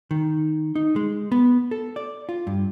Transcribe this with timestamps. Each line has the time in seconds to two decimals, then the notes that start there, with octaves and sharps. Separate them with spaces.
0.11 D#3
0.75 D#4
0.96 G#3
1.32 B3
1.71 A4
1.96 D5
2.29 F4
2.47 G2